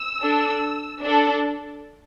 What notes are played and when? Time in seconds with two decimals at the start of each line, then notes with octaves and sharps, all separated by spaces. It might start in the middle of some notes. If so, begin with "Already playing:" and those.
Already playing: E6
0.22 D4 A4
1.03 D4 A4